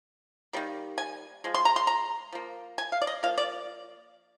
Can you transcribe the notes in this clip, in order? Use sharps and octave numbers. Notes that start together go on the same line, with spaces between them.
D#3 G3 A#3
G#5
F3 G#3
C6
A#5
C6
A#5
F3 A#3
G#5
F5
D5
D#5
F3 A#3 F5
D5